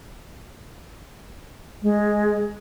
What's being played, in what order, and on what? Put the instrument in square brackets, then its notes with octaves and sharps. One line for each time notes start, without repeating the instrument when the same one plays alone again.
[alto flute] G#3